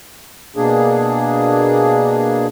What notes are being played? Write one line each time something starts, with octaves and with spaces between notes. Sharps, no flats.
B2 A#3 D4 G#4